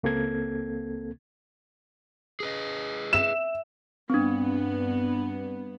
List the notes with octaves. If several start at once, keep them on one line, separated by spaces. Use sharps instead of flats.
C#2 A#3 C4 A4 G#6
G#4 B4 D#5
E5 E7
G2 B3 C4 D4